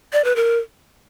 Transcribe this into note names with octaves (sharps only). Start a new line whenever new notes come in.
D5
B4
A#4